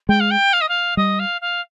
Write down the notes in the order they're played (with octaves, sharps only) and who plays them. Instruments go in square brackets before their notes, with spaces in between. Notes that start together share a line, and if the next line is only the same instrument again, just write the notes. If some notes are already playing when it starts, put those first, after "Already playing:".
[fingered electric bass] G#3 [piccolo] G5
[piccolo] F5
G5
F5
D#5
F5
[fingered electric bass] G3 [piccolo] D#5
[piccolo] F5
F5